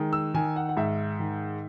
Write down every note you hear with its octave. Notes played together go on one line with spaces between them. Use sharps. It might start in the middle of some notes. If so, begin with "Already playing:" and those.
Already playing: D#3 G#3
E6
D#3 G#5
F#5
F#5
G#2 E5
D#3